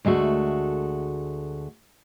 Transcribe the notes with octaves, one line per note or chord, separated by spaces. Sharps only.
D2 G#3 A3 F#4